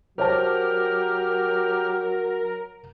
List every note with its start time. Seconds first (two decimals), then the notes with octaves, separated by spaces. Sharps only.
0.18 F#3 G4 A#4 C5 C#5 A5 F6